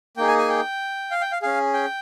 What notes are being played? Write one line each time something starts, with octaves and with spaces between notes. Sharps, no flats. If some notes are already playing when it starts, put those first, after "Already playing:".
A#3 D#4 G#4 G5
G#5
G#5
G5
F5
G5
F5
C#4 G#4 F5
G5